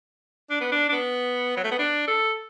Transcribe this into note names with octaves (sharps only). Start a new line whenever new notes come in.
D4
B3
D4
D4
B3
F#3
A3
B3
D4
A4